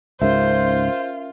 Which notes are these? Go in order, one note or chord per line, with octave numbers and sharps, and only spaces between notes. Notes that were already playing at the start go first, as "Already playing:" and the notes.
C#2 G#2 C#4 F4 A#4 C5 E5